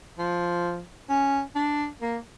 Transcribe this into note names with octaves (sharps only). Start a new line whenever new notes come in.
F3
C#4
D4
A#3